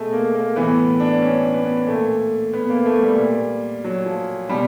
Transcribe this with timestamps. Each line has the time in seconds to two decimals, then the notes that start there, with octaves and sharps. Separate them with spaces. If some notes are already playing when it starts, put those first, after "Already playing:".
Already playing: B2 G#3 A3
0.13 A#3
0.34 A#3
0.56 A2 E3 B3
1.00 D4
1.21 C#4
1.54 B3
1.87 A#2 A3
2.53 B3
2.69 A#3
2.86 A3
3.03 G3
3.18 A#2
3.84 F#3
4.06 F3
4.49 B2 G3